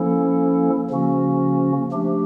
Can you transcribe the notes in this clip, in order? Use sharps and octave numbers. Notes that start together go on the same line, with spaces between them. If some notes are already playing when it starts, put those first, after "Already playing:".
Already playing: F3 A#3 C#4 E4 A4
C#3 F3 A#3 C#4 F#4
F3 A3 D4 G4